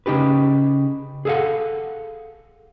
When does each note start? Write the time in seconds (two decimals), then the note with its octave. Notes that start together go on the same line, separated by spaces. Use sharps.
0.06 C#3 D#4 G4 B4
1.25 G#4 A4 D#5 F5 F#5